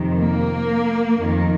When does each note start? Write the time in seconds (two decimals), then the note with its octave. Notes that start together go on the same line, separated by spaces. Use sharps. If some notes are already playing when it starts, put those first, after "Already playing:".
Already playing: F2 C3 D#3
0.20 A#3
1.16 F2 D#3